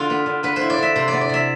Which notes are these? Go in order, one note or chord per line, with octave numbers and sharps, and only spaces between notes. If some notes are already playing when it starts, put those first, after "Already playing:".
Already playing: D3 F4
B3
D3
D3 B4
C5
E4
D5
D3 E5
C3 C5
B3 D5
D5
C3 E5